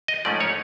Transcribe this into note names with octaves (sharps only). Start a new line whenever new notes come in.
D#5
G#2 F3 A3 C#4 D5
C#5